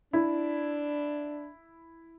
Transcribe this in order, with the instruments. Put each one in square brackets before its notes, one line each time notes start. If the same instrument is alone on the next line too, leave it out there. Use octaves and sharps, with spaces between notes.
[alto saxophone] D4 [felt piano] E4